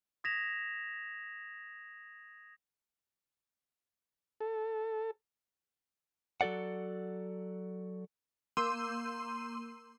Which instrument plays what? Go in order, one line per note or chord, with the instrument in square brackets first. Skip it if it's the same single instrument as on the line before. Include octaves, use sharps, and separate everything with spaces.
[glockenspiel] D#6 G#6 A#6 B6 E7 F7
[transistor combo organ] A4
[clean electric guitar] F#3 F#4 A4 D5 F#5
[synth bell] A#3 C6 E6 G6 D#7